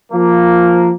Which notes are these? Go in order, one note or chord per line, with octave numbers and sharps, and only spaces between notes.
F3 A#3